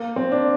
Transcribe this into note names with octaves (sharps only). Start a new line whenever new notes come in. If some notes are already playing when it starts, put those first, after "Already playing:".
Already playing: A#3
C4
D4